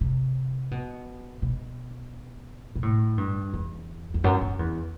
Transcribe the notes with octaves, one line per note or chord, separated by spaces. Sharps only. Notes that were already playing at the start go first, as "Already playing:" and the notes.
C3
B2
B2
B2
A2
G2
E2
E2
F#2
F#2
E2